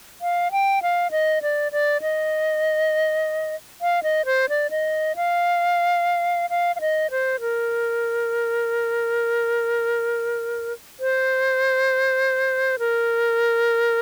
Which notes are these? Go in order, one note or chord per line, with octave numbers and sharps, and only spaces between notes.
F5
G5
F5
D#5
D5
D5
D#5
F5
D#5
C5
D5
D#5
F5
F5
F5
D#5
C5
A#4
C5
A#4